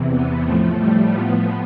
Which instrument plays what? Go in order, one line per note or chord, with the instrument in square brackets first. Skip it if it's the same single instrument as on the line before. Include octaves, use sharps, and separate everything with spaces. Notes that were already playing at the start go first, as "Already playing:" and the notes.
Already playing: [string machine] E2 C3 E3
B3
A2 F3 A3
G3
A2 F3 B3